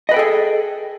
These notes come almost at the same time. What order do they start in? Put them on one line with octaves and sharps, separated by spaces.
D#5 B4 G5 A4 G#4